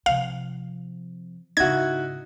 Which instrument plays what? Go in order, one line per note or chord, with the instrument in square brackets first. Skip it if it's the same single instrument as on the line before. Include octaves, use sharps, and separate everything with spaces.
[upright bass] C3 F3 [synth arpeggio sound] F5
[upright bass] G#2 C#3 [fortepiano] D#4 E4 F#4 [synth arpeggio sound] G#6